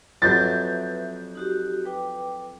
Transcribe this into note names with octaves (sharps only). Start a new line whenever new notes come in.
F2 F#3 B4 E5 G6 A6
D#4 F#4 G4
B4 G5 D6